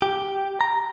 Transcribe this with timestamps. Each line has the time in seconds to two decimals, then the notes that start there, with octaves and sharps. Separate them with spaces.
0.02 G4
0.61 A#5